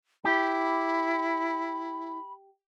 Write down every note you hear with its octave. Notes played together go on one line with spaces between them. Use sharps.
E4 G4 B5